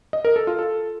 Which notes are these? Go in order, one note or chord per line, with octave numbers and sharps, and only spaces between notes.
D#5
A#4
A4
F4
A4